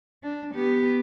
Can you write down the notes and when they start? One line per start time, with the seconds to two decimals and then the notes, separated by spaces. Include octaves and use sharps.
0.23 D4
0.54 B3 G4